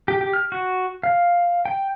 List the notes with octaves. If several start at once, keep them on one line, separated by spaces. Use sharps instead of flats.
G4
G4
F6
F#4
F5
G5